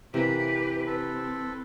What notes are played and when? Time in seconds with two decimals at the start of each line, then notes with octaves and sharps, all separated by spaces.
0.14 C3 E3 A#3 G4 B4 G5
0.86 C4 A4 B4